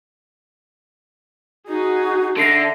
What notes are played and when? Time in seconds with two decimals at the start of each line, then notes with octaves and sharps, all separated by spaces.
1.68 D#4 F#4 G#4
2.37 D3 E5 A#6 C7 D7